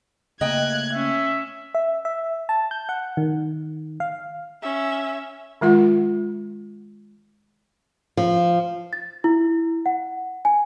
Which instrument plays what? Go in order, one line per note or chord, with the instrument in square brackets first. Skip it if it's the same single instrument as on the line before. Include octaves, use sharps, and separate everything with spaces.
[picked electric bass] C#3 A3 A#3 [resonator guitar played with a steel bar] D#5 G5 [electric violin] F#6 G#6
[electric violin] C#4 [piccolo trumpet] E5
[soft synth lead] E5
E5
A5
G6
F#5
D#3
F5
[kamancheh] C#4 E5
[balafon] D#3 G#3 F4 F#5
[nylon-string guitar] F3
[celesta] A6
E4
F#5
G#5